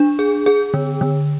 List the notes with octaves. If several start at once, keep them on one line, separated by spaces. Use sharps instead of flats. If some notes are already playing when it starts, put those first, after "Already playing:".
Already playing: D4
G#4
G#4
D3
D3